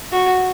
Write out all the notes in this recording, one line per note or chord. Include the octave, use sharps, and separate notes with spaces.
F#4